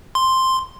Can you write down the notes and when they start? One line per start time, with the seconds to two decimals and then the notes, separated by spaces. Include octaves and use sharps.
0.15 C6